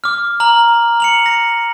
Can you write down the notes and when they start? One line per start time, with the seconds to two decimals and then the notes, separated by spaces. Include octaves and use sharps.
0.04 D6 F6
0.40 A#5 F6 F#7
1.00 C#7 F7 F#7
1.26 A#6